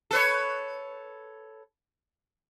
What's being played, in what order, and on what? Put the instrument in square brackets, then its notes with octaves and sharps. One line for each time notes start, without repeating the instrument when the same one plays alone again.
[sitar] A4 B4 C#5